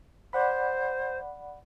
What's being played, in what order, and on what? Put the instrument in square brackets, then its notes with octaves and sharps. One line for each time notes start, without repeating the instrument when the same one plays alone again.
[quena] C5 [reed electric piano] D5 F#5 B5